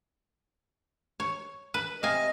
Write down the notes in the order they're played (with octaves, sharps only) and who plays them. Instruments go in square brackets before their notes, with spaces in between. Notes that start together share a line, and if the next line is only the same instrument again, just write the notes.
[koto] C#5
B4
[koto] C3 F5 G#5 [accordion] D#5